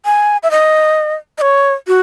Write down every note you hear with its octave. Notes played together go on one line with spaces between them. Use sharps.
G#5
E5
D#5
D#5
C#5
F#4